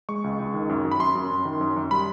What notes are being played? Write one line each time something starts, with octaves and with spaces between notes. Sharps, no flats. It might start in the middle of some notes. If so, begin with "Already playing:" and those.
G#3 C#6
C#2
C#2
D#3
F#2
F#2
B5
F#2 C6
F#2
F#2
D#3
F#2
F#2
G3 B5